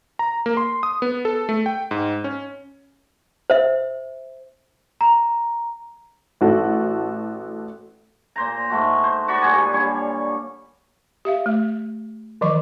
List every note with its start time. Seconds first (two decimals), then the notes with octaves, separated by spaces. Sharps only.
0.19 A#5
0.46 A#3
0.57 C6
0.83 D#6
1.02 B3
1.25 A4
1.49 A3
1.66 G5
1.91 G#2
2.24 C#4
3.50 C5 E5
5.01 A#5
6.41 A1 F#4 A4
8.36 A#2 C5 A#5
8.70 G#2 A3 F#4
9.04 C5
9.28 F#4 D5 B5 C#6
9.42 A#2 G3 G#4
9.72 D3 G3 C#5
11.25 G4 E5 F5
11.46 A3
12.41 D#3 E3 F#3 D#5 C#6